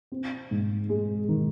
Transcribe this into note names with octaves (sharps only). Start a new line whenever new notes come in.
C4
G#2
G#3
D#3